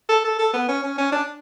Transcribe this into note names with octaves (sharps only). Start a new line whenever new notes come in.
A4
A4
A4
B3
C#4
C#4
C#4
D4